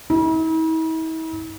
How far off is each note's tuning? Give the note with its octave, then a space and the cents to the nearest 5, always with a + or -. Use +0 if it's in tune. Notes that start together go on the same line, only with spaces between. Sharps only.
E4 -45